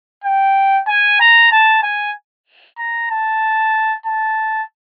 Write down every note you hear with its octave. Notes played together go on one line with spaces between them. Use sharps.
G5
G#5
A#5
A5
G#5
A#5
A5
A5